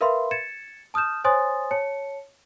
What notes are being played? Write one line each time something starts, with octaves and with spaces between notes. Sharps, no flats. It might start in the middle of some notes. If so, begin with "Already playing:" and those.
A#4 B4 E5 F5 B5 C6
G#6 A6 C#7 E7
A5 D#6 F6 G6 E7
C5 C#5 G#5 C6 D#6 A6
C#5 A5 C#7